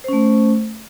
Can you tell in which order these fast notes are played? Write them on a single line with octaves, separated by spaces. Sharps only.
C5 C#4 A3